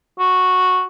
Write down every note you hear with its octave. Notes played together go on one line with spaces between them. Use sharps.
F#4